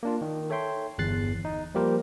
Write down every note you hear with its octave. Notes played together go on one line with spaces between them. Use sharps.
A#3 D4 F4
D#3
A4 C#5 E5 G5 C6
G1 E2 F#6 A6 C7
D#4
F3 G3 A#3 G4 A#4 C5